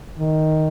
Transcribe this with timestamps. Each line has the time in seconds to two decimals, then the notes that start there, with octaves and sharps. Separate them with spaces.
0.19 D#3